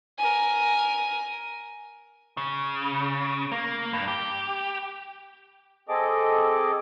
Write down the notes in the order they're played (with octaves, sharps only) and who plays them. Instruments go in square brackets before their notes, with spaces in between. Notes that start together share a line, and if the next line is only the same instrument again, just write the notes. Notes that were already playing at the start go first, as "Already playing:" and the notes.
[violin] A#4 G#5
[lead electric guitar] C#3
A#3
G2
G4
[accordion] C4 G#4 A4 D#5 D6